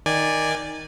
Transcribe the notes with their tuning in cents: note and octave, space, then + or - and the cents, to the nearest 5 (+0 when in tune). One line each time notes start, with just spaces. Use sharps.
D#3 +5 D5 +0 G#5 -15